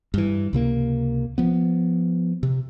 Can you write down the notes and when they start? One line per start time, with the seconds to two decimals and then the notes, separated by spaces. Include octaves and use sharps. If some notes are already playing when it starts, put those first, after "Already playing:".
0.14 G2 E3
0.53 C#2 C3 A#3
1.38 F3 B3
2.43 C3